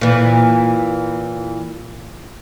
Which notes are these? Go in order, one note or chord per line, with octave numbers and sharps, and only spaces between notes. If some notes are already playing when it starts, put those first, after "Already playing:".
A#2 E3